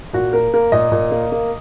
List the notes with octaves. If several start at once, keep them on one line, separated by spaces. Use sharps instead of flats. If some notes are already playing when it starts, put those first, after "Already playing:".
A#2 F#4
A#3 A#4
A#3 A#4
A#2 D#5
A#2
A#3
A#3